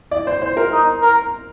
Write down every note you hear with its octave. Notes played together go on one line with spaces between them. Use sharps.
D5
C5
C5
A#4
D#4
A#4